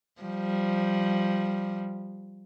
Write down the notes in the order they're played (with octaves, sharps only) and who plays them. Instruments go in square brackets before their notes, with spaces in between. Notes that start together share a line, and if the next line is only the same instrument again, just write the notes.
[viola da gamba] F3 G3